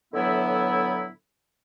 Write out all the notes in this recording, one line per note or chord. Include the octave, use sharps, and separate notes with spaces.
A2 D3 E3 F#3 B3 E4